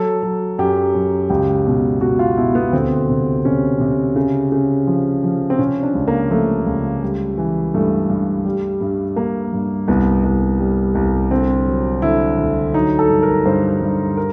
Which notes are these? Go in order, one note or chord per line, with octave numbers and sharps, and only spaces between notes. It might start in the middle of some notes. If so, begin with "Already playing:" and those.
Already playing: F#3 A4
F#3
F#2 G4
F#2
C#2 G4
B2
B2 F#4
F4
B2 E4
B3
D2 C4
C3
C3 C#4
C3
C#3
C#3
F3
F3
C4
C3 C#4
D4
C#2
A#3
F3 A3
C#2
G3
E3
G2 A3
G2
G3
G2
G2 A#3
G2
C2 B3
C2
G3
C2
D3 C4
F#3
D3 E4
D2
F#3 D#4
A4
G2
A#4
G2 C5
G2
A#4